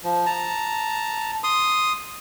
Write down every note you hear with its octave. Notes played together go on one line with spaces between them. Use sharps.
F3
A5 A#5
C6 D#6